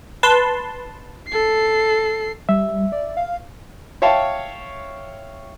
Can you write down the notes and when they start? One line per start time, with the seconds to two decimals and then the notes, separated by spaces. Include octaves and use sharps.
0.23 B4 A5 C6
1.28 A4 C7
2.49 G3 E5
2.92 D5
3.17 F5
4.02 C#5 E5 F5 G5 A5